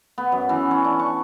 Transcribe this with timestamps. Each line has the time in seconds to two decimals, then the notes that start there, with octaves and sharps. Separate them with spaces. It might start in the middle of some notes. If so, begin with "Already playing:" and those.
0.18 B3
0.32 F#2
0.49 E3
0.71 C#4
0.84 D4
0.99 C#6